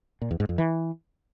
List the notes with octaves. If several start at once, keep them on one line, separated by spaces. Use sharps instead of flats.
A#2
E2
G#2
F2
E3